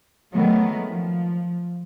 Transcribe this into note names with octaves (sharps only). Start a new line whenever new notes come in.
D#3 F#3 G#3 A3 B3
F3